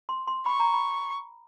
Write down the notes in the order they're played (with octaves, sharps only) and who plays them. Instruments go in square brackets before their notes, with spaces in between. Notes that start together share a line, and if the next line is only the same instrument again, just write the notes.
[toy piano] C6
C6
[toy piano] B5 [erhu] C#6
[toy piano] A#5
B5